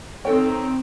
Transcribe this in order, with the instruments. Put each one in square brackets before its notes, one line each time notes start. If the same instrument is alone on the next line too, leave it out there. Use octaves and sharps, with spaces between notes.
[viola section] D#3 C4 D#4 [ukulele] A4 G5 [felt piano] C#5